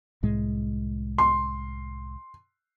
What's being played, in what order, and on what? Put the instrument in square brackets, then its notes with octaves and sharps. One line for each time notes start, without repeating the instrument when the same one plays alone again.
[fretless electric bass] C2 A2 G#3
[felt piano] C6